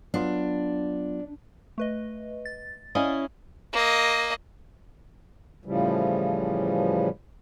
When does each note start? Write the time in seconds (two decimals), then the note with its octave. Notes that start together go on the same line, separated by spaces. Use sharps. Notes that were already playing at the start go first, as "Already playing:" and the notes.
0.14 F#3 B3 D4 F4
1.78 A3 B4 D#5
2.45 A6
2.95 C#4 E4 D5 D#5 F5 G#5
3.73 A#3 D#5
5.65 A2 C#3 E3 F3 G3